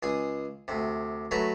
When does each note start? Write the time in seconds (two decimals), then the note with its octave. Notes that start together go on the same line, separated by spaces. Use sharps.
0.03 C#2 G#4 D#6
0.68 D2 C3
1.31 F#3 A3 B4 G#5 A#5